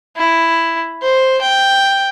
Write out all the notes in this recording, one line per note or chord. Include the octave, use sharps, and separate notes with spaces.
E4
C5
G5